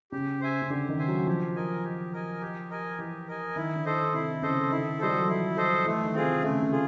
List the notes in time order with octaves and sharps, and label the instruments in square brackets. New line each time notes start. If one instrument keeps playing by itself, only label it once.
[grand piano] C#3 [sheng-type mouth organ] G4
[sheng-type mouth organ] C5 E5 G#5
[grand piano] C#3
[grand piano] D3 [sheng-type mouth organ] G4
[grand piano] D#3
[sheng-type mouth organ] C5 E5 G#5
[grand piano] F#3
[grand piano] F3 [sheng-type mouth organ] G4
[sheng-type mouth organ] A#4 D#5 G#5
G4
A#4 D#5 G#5
G4
A#4 D#5 G#5
[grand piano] E3 [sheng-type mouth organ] G4
[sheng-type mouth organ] A#4 D#5 G#5
[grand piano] D#3 [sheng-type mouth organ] E4
[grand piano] D3
[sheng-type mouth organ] A4 C5 D#5
[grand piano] C3 [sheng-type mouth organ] E4
[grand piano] C#3 [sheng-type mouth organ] A4 C5 D#5
[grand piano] D#3 [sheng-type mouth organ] E4
[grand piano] G3 [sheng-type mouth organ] A4 C5 D#5
[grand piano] F#3
F3
[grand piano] E3 [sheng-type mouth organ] E4
[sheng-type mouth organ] A4 C5 D#5
[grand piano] E3 [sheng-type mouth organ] A3
[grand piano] D#3
[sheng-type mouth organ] C4 F4 G#4
[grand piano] C3
[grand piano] C#3 [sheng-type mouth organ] A3
[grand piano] C#3
[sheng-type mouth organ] F4 G#4